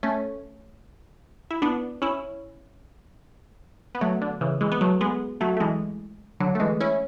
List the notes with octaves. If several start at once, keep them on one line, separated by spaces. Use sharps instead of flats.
A3 C#4
E4
B3 D4
C#4 E4
B3
F#3 A3
D3
C#3 E3
E3 G#3
B3
F#3 A3
G#3 B3
F#3 A3
A3
E3 G#3
D3 F#3
A3
E3 G#3
C#4 E4